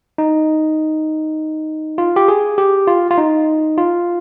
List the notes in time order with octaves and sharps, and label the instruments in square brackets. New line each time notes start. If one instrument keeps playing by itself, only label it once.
[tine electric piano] D#4
F4
G4
G#4
G4
F4
F4
D#4
F4